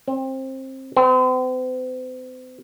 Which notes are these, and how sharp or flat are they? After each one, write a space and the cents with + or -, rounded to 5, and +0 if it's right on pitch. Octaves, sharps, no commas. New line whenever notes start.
C4 +25
C4 -40